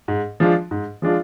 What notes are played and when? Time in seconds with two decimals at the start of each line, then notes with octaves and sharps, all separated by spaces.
0.08 G#2
0.40 F3 G#3 D4 F4
0.71 G#2
1.02 F3 G#3 D4 F4